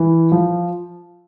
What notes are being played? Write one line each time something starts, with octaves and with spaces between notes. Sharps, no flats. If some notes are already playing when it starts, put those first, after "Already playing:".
Already playing: E3
F3